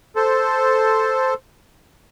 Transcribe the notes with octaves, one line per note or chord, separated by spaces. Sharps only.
A4 C5